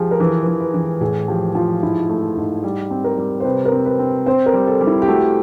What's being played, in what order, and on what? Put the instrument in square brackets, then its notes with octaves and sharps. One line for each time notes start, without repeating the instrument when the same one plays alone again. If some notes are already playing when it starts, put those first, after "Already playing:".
Already playing: [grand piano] F3 [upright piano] G4 G#4
[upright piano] A#4
[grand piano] E3 [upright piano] B4
[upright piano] B4
[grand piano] E3
[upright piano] B4
[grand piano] E3
[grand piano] A2 [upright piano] G#4
[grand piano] F3 [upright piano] G4
[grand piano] F3 [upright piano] F4
[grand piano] G#2 [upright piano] E4
[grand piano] A3
G#2
G3
C4
[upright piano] A#4
[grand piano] G3
[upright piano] C5
[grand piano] C3 [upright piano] B4
[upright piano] A#4
[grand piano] C4
[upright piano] B4
[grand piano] C4
[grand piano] C4 [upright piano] C5
[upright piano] A#4
[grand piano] G3
[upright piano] A4
[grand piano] G3
[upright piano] E4
G4
[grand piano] A3 [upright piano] F#4